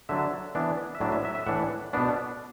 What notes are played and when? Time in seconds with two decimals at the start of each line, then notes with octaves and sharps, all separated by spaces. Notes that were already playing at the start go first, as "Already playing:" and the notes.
0.09 D3 F#3 D4 E5
0.55 E3 B3 D4
0.95 E5
1.00 A2 F#3 D4 D5
1.12 E5
1.25 E5
1.35 E5
1.46 A2 E3 D4 F#5
1.93 B2 B3 D4